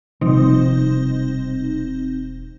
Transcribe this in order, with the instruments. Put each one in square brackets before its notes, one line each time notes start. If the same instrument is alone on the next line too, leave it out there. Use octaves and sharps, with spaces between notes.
[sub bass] E1 [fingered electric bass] C3 F3 G3 [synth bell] C4 D#4